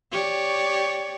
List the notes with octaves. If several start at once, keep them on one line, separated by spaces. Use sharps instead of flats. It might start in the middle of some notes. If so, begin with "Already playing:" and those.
G4 C#5 D5